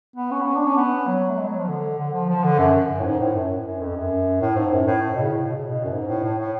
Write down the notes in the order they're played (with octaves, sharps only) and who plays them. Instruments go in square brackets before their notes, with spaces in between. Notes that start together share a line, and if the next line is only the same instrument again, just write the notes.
[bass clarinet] B3
C#4
B3
C#4
D4
C#4
B3
F#3
A3
G#3
F#3
F3
D3
D3
F3
F3
D3
F#2
F#2
A2
G#2
A2
F#2
F#2
F2
F#2
A2
G#2
F#2
A2
A2
B2
C#3
A2
B2
C#3
B2
F#2
G#2
A2
A2
A2